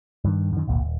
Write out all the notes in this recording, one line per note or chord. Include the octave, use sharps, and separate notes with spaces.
G2 D#3
F#2 D#3
D1 G#1 D2 A#2
D#1